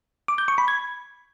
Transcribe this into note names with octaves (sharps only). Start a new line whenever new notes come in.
D6
G6
C#6
B5
G#6